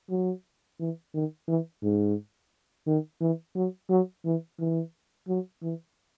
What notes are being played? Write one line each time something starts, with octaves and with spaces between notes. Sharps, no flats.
F#3
E3
D#3
E3
G#2
D#3
E3
F#3
F#3
E3
E3
F#3
E3